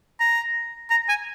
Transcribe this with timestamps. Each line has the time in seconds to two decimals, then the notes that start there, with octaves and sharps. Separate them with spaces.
0.20 A#5
0.90 A#5
1.09 G#5